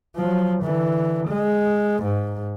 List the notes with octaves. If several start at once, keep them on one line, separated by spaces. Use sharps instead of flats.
F3 F#3
D3 E3
G#3
G#2